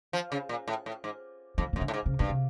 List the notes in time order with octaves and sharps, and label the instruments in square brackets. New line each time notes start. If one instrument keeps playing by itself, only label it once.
[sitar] F3
C#3
A#2
A2
A2
G#2
[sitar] F2 [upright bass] D#3
[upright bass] D#3
[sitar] F#2
[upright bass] D3
[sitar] A2
G#2
[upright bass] C#3
[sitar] G2 [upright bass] B2
[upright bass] C3